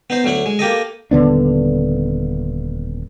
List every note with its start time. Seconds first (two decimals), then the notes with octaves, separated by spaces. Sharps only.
0.10 B3 D#4 C5
0.24 D2 F#3 E4 F#5
0.46 G#3
0.59 A#3 G4 A4 D#5
1.11 D#1 D3 B3 D4